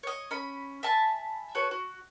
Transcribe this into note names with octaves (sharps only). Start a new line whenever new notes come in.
C#5 D#5
C#4 B5
E5 G#5 A5 B5
F#4 A4 B4 C#5
F#4